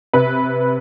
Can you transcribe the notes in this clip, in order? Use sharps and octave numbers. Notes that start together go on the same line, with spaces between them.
C3 B4